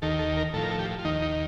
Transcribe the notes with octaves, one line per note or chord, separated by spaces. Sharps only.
D#2 D#3 A4
A4
A#4
A2 F3 A4
A#4
A4
G4
F4
D#2 D#3 D#4
D#4